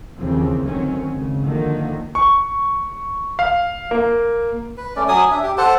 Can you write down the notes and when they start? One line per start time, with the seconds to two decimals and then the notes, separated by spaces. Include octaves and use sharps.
0.18 D#2 C#3 E3 F3 C4
0.65 D2 D#3 F#3 C4 C#4
1.11 G#1 C#3
1.44 D3 D#3 F3 A#3
2.15 C#6
3.39 F5
3.91 A#3
4.77 B4
4.96 A3 C#4 D5
5.08 F#3 G#5 D#6
5.31 D4 E5
5.43 G4
5.58 A4 C5 F#5 A5